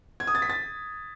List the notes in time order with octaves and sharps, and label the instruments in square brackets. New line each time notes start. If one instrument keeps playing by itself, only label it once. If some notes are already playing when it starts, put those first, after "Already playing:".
[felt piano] G#6
D#6
A6
B6
A6